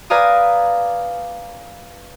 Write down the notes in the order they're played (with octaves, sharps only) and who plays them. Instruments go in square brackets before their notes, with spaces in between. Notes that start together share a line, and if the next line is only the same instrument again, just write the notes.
[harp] B4 D5 F5 G#5 A#5 D#6